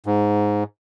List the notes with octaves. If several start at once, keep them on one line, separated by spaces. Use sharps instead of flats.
G#2